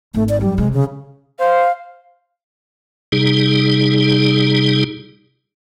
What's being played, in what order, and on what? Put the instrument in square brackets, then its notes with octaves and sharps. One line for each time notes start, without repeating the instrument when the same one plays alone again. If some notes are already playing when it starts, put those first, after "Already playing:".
[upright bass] G#1 [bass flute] A3
[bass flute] D5
[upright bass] F#2 [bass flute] G3
[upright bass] C3 [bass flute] G#3
[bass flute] C#3
[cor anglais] C5 [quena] F5
[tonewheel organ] C3 G3 D#4 G#4